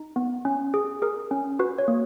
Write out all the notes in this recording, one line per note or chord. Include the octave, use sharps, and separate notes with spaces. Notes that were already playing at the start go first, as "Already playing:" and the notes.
Already playing: D#4
B3
C#4
G#4
G#4 A#4
C#4
F#4 B4
C#5
A#3